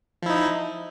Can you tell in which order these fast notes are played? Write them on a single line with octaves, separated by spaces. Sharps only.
F3 E4 D#4